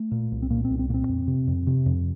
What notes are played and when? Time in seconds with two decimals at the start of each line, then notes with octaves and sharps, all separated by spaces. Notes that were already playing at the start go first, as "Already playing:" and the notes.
Already playing: A3
0.11 A#2
0.32 C2
0.42 C4
0.50 A#2 A#3
0.65 C4
0.70 C2
0.79 C4
0.89 A#2 A#3
0.94 C4
1.09 F2
1.28 C3
1.47 F2
1.67 C3
1.86 F2